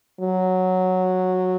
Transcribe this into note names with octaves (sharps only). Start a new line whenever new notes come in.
F#3